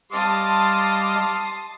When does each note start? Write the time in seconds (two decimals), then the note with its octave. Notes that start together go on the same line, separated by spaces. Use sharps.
0.12 G3 D#5 F5 A5 C6 D6 D#6